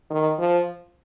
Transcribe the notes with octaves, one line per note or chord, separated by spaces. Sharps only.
D#3
F3